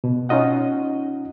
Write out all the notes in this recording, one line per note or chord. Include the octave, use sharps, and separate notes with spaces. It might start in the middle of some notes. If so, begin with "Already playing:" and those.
B2
C#4 D#4 F4 D#5 F#5